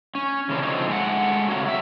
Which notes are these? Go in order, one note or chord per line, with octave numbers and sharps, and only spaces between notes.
C#4
C#3 E3 C4 D4
D3 F3 F#3 A3 C4 D#4
G#3 A3 B4 F#5
C#3 F#3 C4 C#4 F#4
F#3 E5